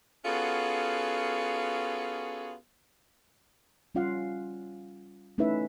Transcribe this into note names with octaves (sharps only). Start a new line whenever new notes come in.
B3 C#4 F4 F#4 G#4 A4
G3 C#4 F4 F5 F#5
A3 C#4 D#4 E4 B4 E5